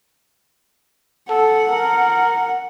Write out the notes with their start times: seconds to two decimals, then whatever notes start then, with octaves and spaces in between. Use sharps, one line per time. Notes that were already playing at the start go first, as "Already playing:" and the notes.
1.29 A4 F#5
1.71 A#4